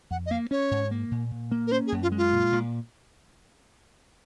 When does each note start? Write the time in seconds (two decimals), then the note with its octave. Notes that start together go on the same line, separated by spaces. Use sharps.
0.11 F2 F#5
0.26 D#5
0.31 A#3 F5
0.51 C#4 C#5
0.71 G#2
0.91 A#3
1.11 A#2
1.31 A#2
1.51 A#3
1.67 A#4
1.72 C#4 C5
1.87 G#4
1.92 F#2
2.03 F4
2.12 G#3
2.17 F4
2.33 A#2
2.52 A#2